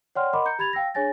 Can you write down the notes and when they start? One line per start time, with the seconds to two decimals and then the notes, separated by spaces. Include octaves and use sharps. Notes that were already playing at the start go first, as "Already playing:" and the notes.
0.15 C#5 D5 F#5 G5 C6 F6
0.33 A#4 D#5 F#5 B5 C6 D6
0.45 A#5 G6 C#7
0.59 G4 B5 G#6 A6 F7
0.73 F5 G5 E6 A#6
0.94 D4 G#4 C#5 G#5 A6 A#6